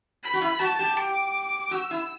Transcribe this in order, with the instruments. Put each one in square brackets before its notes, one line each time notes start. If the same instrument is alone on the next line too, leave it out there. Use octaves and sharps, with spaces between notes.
[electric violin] B5
[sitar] F#4
E4
[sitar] F#4 [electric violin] A5
[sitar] G4
[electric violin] D6
[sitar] F#4 [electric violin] E6
[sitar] E4